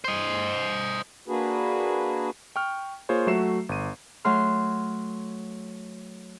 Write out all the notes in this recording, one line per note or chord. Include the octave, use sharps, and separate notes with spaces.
C5 D#5
A#3 D4 F#4 G#4 B4
G5 C#6 F6
A#3 F4 G#4 C5 C#5
F#3 A3 F#4 E5 C7 E7
G1 D#7
F#3 A3 C6 F6